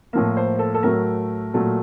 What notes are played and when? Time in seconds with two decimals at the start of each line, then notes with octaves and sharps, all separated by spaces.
0.13 A2 F3 A#3 A#4
0.37 C5
0.59 A4
0.74 A4
0.83 A2 F#3 A3 A#4
1.54 A#2 F#3 A3